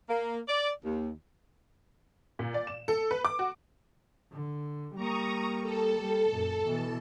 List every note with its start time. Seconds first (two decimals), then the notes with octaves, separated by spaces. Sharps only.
0.09 A#3
0.48 D5
0.84 D#2
2.39 A#2
2.54 D5
2.67 E7
2.88 A4
3.11 B4
3.25 D6
3.39 F#4
4.32 D3
4.95 G3 A#3 A#5 C#6 D#6
5.62 A4
6.00 G3
6.31 F#2 A#2
6.64 B2 E3 A5